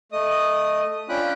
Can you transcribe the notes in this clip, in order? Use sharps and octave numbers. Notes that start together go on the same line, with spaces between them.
A3 D#5 D#6
C#4 D4 F4 G5 B5 F#6